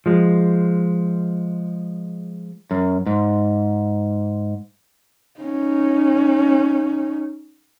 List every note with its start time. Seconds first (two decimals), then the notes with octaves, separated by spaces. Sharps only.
0.06 F3 G#3
2.71 F#2
3.06 G#2
5.40 C#4 D#4